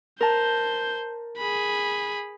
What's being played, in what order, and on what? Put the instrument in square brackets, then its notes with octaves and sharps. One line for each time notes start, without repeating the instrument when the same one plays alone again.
[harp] A#4 A5 [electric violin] C5 G6
[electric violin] G#4 B5